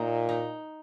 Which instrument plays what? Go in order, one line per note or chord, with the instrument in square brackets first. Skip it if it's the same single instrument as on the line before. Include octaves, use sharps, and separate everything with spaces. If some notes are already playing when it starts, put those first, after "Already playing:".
Already playing: [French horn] A#2 [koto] D#4
[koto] D#4